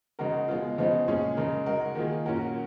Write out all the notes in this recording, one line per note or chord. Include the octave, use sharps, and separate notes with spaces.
C#3 G#3 D#4 F#4 A#4
B2 G#3 B3 F4
C#3 F3 G#3 B3 D#4
A#2 G#3 C#4 G#4
C#3 G#3 D#4 A#4
G#3 D#4 F#4 A#4
D#3 A#3 F4 G#4
A#2 F#3 C#4 F#4 A#4